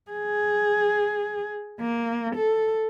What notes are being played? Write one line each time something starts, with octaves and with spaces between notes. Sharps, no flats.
G#4
A#3
A4